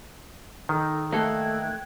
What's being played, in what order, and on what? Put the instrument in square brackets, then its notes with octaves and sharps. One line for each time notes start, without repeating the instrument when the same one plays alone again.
[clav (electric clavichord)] D#3 [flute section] D#4 [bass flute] A4
[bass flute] A3 [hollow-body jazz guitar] A#3 D#4 A4 [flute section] G5 F#6 G#6